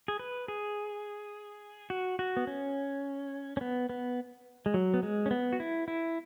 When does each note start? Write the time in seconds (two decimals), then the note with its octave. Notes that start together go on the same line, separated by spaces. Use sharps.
0.08 G#4
0.19 B4
0.48 G#4
1.90 F#4
2.19 F#4
2.37 B3
2.47 C#4
3.57 C#4
3.61 B3
3.89 B3
4.66 G#3
4.74 F#3
4.94 B3
5.03 G#3
5.26 C#4
5.31 B3
5.53 F#4
5.60 E4
5.88 E4